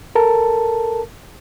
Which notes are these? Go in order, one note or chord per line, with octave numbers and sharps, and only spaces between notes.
A4 A#4 A5